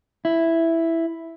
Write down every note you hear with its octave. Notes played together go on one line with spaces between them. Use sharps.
E4